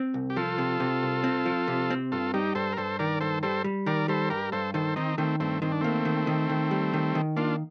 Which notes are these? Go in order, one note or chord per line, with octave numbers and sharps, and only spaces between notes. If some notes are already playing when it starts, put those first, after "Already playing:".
Already playing: C4
C2
G4
F3 F4 A4
C3
C3
C2
C4
F3
C3
C4
G2 F4 A4
G3 D#4 G4
G2 A4 C5
A#4
G2 A4 C5
D#3 A#4 D5
G2 A4 C5
G3 A4 C5
G3
D#3 A#4 D5
G3 A4 C5
G2 G4 A#4
G2 A4 C5
D#3 A4 C5
D#3 C4 D#4
D#3 A3 C4
G2 A3 C4
D#3 C4
D4
A3 A#3 C4
D#3
D#3
D#3
G3
D#3
D#3
A#3 D4 F4